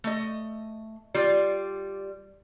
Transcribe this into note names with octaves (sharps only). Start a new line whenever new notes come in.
A3 D#5
G3 F4 D5